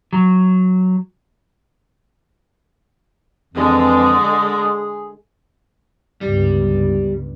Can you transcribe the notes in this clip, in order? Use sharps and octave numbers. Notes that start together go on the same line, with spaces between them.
F#3
F2 D3 E3 F3 G#3
G#4
G1 C#2 G2 G3